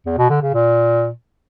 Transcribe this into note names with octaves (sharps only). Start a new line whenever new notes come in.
E2
B2
D3
C#3
A#2